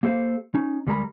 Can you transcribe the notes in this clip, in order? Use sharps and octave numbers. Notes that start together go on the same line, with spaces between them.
A#3 G4 A4 C5 F5
C#4 D#4
D2 G3 G#3 A#4 A#5 B5